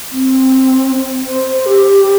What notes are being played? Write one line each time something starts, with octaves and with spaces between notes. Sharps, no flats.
C4
C5
G4